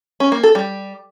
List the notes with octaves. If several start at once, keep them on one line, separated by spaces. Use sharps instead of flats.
C#4
A#3
A4
G3